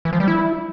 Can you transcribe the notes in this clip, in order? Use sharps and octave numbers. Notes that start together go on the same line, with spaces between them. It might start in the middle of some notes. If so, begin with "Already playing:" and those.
E3
F3
G3
E4